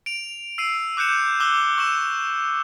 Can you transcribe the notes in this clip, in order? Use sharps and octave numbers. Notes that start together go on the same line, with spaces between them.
D7 F7
E6 C7 D#7
D6 F#6 G6 C#7 E7
G6
D6 E6 F#6 G7
C#6 E6 E7